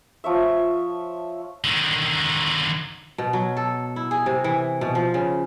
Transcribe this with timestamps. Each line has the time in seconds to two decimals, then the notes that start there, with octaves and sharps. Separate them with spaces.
0.24 F3 C#5 E5
1.64 D3 D#3
3.18 B2
3.33 F#3
3.57 A4
3.96 E4
4.11 G#4
4.26 C3
4.44 E3
4.81 B2
4.95 F3
5.14 C#3